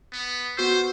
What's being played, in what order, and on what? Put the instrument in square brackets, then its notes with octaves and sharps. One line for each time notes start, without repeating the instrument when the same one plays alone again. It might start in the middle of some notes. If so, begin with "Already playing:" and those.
[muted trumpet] B3
[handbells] B3 F#4 E6 [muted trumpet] C5